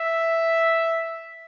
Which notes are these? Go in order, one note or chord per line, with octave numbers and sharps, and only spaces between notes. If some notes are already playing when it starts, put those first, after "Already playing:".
Already playing: E5